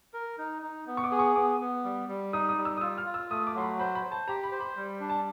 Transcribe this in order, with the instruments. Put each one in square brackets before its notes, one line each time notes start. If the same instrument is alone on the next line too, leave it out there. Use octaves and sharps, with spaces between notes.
[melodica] A#4
D#4
D#4
B3
[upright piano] C#6
D6
[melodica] G#4
[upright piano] C#6
[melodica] B3 [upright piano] D6
[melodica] B3
G3
G3
[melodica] D#4 [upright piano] D#6
[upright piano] D#6
[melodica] G3
[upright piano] E6
D#6
[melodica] F4 [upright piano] E6
[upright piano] F6
[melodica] F4
[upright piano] E6
[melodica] A3 [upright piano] D#6
[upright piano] D6
[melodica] F#3 [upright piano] C6
[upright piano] B5
[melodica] C5 [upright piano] B5
[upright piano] B5
[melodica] C5
[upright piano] A5
[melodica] G4 [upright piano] A#5
[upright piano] B5
[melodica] C5
[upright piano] B5
[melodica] G3
D4
[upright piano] A5